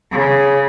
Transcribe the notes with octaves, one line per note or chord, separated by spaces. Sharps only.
C#3